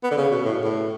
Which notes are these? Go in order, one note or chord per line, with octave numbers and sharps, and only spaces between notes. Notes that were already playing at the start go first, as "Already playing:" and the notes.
B3
D3
C#3
B2
A2
A2